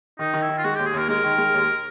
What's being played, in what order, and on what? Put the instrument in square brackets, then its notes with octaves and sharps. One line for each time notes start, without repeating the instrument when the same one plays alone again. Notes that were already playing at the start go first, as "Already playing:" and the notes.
[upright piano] D#3 [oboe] D#4
[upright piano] D#3
[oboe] E4
[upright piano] D#3
[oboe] F4
[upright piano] G#3 [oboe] F#4
[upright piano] D#2 [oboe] G4
[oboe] G#4
[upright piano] D#2 [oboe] A#4
[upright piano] G#3 [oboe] A#4
[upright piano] D#3
G#3
D#2